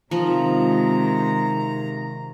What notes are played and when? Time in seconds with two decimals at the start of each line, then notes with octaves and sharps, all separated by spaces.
0.11 C3 D#3 F3 G#3 D#4 A#5